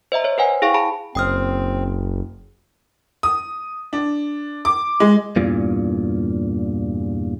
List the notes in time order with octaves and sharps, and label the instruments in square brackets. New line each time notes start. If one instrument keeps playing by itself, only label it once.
[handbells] C5 D#5 E5 A#5
C5 C#5
B4 C5 F#5 G#5
E4 G#4 F5 G5 C#6
G#4 A5 B5
[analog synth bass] F#1 [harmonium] C4 [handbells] G5 D#6 F6
[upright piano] D#6
D4
D6
G#3
[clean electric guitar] E2 G2 A#2